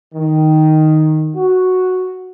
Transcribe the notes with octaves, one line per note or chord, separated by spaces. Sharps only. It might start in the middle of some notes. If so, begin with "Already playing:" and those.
D#3
F#4